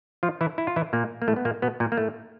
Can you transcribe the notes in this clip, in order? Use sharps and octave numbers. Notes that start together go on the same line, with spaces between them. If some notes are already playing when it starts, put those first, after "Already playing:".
F3 F4
E3 E4
E4
F4
E3 E4
A#2 A#3
A#3
A2 A3
B3
A#2 A#3
B2 B3
A#2 A#3
A#3
A2 A3